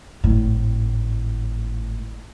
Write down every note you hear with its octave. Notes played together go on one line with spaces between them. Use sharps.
G#1 A2